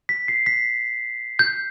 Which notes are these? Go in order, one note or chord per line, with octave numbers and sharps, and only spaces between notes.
B6
C7
B6
G6